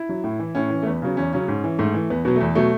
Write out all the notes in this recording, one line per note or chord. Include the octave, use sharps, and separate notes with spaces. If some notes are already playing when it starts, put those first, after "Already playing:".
Already playing: E4
F#3
A2
E3
A2 C#4
E3
A3
E2 B3
C#3 F#3
E2 C#4
C#3 F#3 C#4
G#2
E3
G#2 A3
E3
E2 B3
B2 F#3 B3
E2 A3
B2 F#3 A3